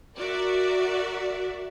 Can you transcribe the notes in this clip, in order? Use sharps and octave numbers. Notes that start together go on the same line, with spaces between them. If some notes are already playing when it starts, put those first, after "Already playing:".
F#4 A#4 D5 E5